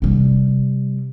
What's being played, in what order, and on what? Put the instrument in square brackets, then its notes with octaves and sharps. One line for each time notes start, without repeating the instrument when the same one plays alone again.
[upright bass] C3 G3